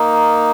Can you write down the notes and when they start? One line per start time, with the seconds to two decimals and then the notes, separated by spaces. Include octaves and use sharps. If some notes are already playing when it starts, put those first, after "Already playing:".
Already playing: A#3 D#4